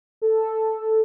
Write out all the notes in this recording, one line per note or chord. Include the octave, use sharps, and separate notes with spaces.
A4